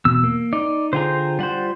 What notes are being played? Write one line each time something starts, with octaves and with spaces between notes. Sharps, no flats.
E2 B2 E6
A#3
D#4 D5
D3 F4 G#4 C5 G5 A#5
G3 F4 C5 F#5